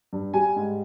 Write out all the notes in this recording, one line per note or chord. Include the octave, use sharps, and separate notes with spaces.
G2
G3 G#5
G#2